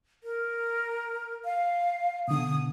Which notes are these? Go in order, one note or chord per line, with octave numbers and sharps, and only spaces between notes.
A#4
F5
B2 D3 D#6